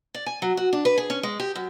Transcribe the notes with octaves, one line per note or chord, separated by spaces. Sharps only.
D5
G#5
F#3
F#4
D4
B4
G#4
C#4
G#3
G4
F#2